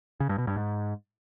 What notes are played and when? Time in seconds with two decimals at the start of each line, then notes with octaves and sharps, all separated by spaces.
0.20 C#3
0.29 G2
0.38 B2
0.47 G2
0.56 G#2